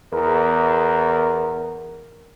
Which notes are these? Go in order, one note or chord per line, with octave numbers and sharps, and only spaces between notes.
E2 A#4